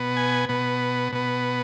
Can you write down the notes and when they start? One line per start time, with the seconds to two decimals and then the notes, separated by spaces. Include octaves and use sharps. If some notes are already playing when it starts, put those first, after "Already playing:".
Already playing: B2 B3
0.17 G#5
0.49 B2 B3
1.12 B2 B3